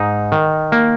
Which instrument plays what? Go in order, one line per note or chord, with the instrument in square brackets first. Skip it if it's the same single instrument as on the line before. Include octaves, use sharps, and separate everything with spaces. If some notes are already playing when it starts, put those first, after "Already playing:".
Already playing: [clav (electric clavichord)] G#2 D#4
D#3
A#3